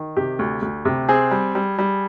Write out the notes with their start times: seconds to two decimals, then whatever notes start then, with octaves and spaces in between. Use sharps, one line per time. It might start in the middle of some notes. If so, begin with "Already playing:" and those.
Already playing: D#3
0.17 C3 G4
0.39 D2
0.62 D2
0.85 C3
1.09 C4 G#4
1.31 G3
1.55 G3
1.78 G3